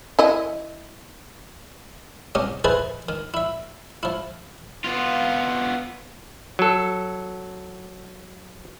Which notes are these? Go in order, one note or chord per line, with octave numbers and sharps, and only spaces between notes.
E4 D#5
C2 C#4 G4 D#5
E4 G#4 B4 C5 D#5 A5
D#3
E4 E5
F3 E4
B3 F4
F#3 A4